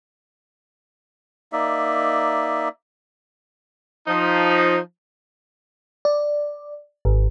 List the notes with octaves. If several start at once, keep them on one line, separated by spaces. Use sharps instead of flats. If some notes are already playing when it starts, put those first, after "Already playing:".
A#3 D#4 D5 E5
F3 D#4
D5
G#1